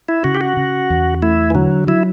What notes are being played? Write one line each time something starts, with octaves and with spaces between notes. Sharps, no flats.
E4
C#3 F#4
G4
F#4
C#3
E2
A3 E4
E3
D3 F#3
F#3 E4